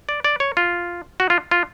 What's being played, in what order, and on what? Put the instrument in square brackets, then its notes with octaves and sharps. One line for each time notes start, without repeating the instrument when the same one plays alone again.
[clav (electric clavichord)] D5
D5
C#5
F4
F#4
F4
F4